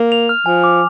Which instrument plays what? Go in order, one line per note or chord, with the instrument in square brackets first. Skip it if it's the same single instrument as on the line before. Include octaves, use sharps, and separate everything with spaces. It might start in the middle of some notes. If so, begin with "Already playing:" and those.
Already playing: [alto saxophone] A#3
[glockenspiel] F7
F6
[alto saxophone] F3 [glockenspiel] G#5
[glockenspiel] D6